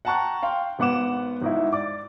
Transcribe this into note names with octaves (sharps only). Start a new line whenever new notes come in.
F#5 G5 A5 A#5 C#6 F#6
F5 G5 C6
G#1 B3 F#5 D6 E7
G#1 D#4 E4
D5 D6